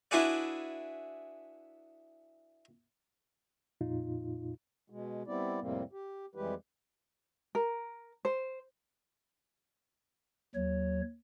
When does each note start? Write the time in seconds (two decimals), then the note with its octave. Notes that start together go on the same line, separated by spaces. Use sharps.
0.11 D4 E4 F#4 G#4 B4 D5
3.81 F2 A#2 D#4 F4
4.90 B2 G#3
5.27 G3 B3 C4 E4 D5
5.60 F2 A2 C3 G3 A#3 C4
5.92 G4
6.35 F2 E3 G3 G#3 G4 B4
7.55 A#4
8.25 C5
10.55 D#2 F#3 C#5